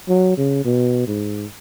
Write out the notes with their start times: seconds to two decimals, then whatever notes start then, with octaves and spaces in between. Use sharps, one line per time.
0.08 F#3
0.37 C#3
0.65 B2
1.08 G#2